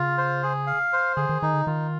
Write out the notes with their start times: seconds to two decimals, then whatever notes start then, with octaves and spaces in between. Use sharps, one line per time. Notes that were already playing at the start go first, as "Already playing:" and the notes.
Already playing: C#3 F4
0.18 C5
0.43 G#4
0.67 F5
0.93 C5
1.16 D3 G#4
1.29 D#3
1.42 D#3 D#4
1.54 D3
1.67 D#3 F4